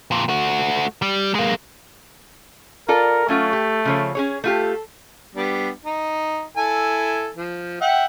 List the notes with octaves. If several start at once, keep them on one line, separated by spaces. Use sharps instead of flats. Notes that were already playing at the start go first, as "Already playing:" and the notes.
F2 A#2
A3 F#4
G3
G#3 A#3
F4 A4 A#4 D5
F#3 A3 C#4 F4
G4
C#3 F3 C#5
C#4 G#4 C#5
A3 F4 G4 A4
G3 B3 D4
D#4
E4 A4 G#5
F3
E5 F#5 G5